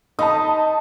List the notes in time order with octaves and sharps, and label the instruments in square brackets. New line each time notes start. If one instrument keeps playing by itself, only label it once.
[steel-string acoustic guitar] D#4 [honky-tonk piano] A5 B5 D#6